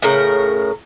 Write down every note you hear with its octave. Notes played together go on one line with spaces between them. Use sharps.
A2 C#3 A#4